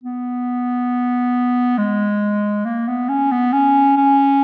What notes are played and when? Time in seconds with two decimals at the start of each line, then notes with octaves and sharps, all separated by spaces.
0.03 B3
1.78 G#3
2.65 A#3
2.88 B3
3.09 C#4
3.32 B3
3.53 C#4
3.97 C#4